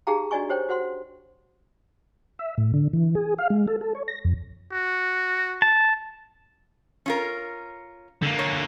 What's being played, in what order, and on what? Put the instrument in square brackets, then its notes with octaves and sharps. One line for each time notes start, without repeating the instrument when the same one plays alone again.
[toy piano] D#4 G4 G#4 F5 G5 A#5
D4 F#4 D5 D#5 G#5 C#6
G4 C5 C#5 G5
F#4 C5 F#5 C6
[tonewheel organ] E5
A2
D3
E3
G#4
F5
G#3
A4
A4
C#5
A#6
F2
[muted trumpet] F#4
[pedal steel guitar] A5
[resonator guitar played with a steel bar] C#4 F4 A#4
[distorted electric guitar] D3 A#3
[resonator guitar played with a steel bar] C#5